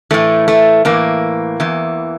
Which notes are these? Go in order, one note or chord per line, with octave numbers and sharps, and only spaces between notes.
A2 E3 A3
A3
A2 E3 A#3
E2 E3